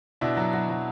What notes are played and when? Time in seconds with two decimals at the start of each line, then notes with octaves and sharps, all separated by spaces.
0.21 B2 D4 E4
0.37 F#3
0.53 F#3
0.69 F#3